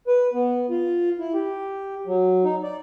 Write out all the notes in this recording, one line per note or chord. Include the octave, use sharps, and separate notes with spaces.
B4
B3
F4
E4
G4
F#3
D#4
D5